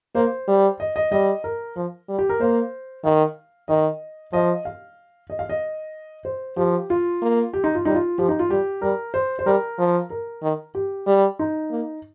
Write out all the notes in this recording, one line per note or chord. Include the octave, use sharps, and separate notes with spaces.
A#3 C5
G3
D#5
D#5
G3 D#5
A#4
F3
G3
G4
A#4
A#3 C5
D#3 F5
D#3 D#5
F3 D#5
F5
D#5
F5
D#5
C5
F3 G4
F4
A#3
G4
D#4
F4
G3 D#4
F4
F3 G4
D#4
F4
G3 G4
G3 A#4
C5
C5
G3 A#4
F3
A#4
D#3
G4
G3
D#4
A#3